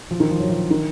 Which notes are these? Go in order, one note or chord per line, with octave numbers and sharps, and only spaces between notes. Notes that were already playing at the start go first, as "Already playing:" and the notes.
F3
D#3
F3
F#3
F3
D#3